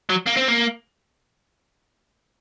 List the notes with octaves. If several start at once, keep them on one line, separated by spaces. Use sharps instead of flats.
F#3
A#3
C4
A#3